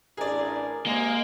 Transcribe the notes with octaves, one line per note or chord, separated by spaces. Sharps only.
A1 D4 G#4 A#4 D5
C3 G#3 A#3 D#5